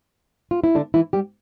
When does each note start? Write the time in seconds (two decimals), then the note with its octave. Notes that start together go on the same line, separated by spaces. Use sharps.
0.51 F4
0.64 E4
0.75 D3 D4
0.94 E3 E4
1.13 G3 G4